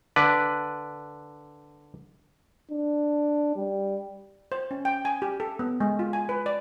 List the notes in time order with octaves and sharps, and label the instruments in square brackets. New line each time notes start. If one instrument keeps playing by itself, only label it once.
[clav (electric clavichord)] D3 B4 D5
[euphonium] D4
G3
[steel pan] C5
C#4
G5
G#5
G4
A4
B3
G#3
F4
G#5
B4
D5